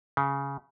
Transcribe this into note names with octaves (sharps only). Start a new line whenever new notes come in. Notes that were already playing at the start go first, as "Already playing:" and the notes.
C#3